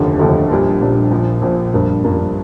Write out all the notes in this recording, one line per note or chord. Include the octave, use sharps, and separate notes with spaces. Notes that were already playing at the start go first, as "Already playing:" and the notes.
Already playing: F1 D#2 D3 F3 A3
F1 D#2 D3 F3 A3
A#1 A#2 G3 D4
A#1 A#2 G3 D4
A#1 A#2 F3
A#1 A#2 F3
G2 F3 A#3 D4
G2 F3 A#3 D4